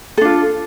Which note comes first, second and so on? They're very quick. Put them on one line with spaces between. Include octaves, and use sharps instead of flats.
A4 D4 F4